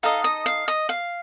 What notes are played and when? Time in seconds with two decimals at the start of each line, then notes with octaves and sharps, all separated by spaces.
0.03 D#4 A4 D#5 F5
0.24 D#5
0.46 F5
0.68 D#5
0.89 F5